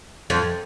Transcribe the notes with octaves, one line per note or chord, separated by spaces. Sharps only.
F2